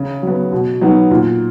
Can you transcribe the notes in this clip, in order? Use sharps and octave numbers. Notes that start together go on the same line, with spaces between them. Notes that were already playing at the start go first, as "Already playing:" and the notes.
Already playing: C#3
F#3 B3
B2
F#3 B3 D#4 F#4
A#2